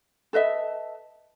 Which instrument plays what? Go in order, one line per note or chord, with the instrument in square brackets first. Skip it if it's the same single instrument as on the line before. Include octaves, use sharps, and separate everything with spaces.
[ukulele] A4 B4 D#5 E5